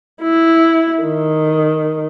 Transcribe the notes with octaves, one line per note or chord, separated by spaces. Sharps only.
E4
D#3